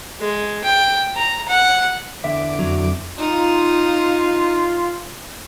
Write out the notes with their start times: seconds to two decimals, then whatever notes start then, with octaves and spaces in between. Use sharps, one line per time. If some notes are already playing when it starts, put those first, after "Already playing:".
0.20 G#3
0.64 G5
1.16 A#5
1.48 F#5
2.24 E2 D3 E5 D6
2.59 F2 F#3
3.18 D#4 F4